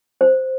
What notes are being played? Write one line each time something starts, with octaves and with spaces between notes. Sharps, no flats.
C5